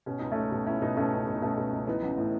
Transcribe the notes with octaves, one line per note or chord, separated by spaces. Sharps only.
B2 C#4
C#2 D#4
A3 C#4
B2
B2
C#2 C#4 E4
B2 B3 D#4
B2 A3 C#4
C#2
B2
D#4
B2 A3 C#4
B2
C#2
E3 B3 D#4
A1
A2